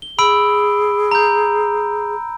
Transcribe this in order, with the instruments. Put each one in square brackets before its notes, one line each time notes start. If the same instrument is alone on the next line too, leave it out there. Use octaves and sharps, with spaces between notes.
[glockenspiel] G7
[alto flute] G#4 [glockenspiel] B5 E6 D7
[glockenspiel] A#5 G6